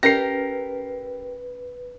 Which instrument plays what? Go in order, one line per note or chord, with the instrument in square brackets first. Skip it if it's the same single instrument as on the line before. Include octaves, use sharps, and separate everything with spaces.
[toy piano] C#4 D#5 [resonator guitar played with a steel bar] G4 A#4 [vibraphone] B4 [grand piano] A#6 C7